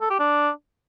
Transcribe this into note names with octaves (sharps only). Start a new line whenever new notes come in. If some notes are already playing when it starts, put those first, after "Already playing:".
A4
G4
D4